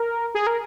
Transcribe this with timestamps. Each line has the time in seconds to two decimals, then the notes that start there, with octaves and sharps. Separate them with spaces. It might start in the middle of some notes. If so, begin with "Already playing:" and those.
Already playing: A#4
0.35 G#4
0.47 A#4